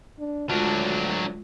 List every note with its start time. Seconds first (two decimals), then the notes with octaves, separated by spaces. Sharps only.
0.19 D4
0.49 D2 F#3 G#3 D4 F4